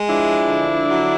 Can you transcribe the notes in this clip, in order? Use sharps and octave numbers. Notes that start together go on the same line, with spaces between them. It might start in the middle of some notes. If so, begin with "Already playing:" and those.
Already playing: G#3
F3 D4 E4
D3
F#3